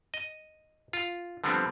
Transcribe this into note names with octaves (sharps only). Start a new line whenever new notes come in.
D#5
F4
D3 F3 G3 B3 C4